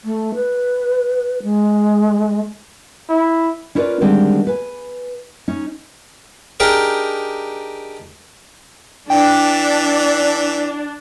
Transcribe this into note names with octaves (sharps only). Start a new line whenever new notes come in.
A3
B4
G#3
E4
C#4 E4 F4 A#4 B4 D5
D3 D#3 G3 G#3 C4
B4 G#5
C#4 D#4
D4 D#4 G4 G#4 A#4
E3 D4 G5